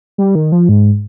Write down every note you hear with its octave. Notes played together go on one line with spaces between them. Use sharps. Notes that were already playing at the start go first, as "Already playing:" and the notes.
G3
D#3
F3
G#2